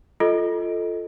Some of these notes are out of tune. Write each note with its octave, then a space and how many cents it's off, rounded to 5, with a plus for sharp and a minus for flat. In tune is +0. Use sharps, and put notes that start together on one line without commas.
F4 +0 A4 +0 D#5 +10